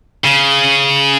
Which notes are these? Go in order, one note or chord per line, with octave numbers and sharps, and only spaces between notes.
C#3